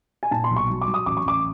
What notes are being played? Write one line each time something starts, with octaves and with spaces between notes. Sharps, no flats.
G#5
A#2 A5
C6
B1
C#6
F#3
D6
F#3
D#6
A1 D6
C#6
A1 D6